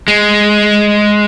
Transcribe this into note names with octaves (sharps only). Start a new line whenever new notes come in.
G#3